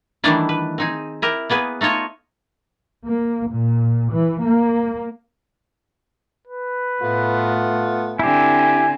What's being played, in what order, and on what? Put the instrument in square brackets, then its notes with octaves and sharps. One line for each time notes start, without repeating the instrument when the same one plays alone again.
[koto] D#3 E3 G3 A3 D4 E4
B4
C4 D#4 G#4
E4 G4 A#4
A#3 B3 G#4 B4
A3 D#4 F4 C#5 D#5
[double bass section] A#3
A#2
E3
A#3
[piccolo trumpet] B4
[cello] A2 [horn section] A3 B3 F4
[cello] D3 C4 [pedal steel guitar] E4 G4 [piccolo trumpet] G#5